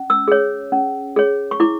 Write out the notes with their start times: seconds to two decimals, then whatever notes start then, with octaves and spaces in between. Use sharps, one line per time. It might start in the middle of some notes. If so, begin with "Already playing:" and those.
Already playing: C#4
0.10 E6
0.28 G#4 C#5
0.72 C#4
1.16 G#4 C#5
1.51 C#6
1.60 E4 D6